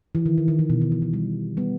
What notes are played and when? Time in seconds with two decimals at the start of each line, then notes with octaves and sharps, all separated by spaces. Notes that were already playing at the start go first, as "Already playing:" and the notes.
0.15 E3
0.26 D#3
0.38 D#3
0.48 D#3
0.59 E3
0.70 B2
0.81 D#3
0.92 E3
1.02 E3
1.13 G3
1.57 G3 B3